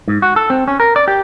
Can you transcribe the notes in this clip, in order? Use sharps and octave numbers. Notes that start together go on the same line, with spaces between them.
G#2
F#4
A4
C4
C#4
A#4
D5
G4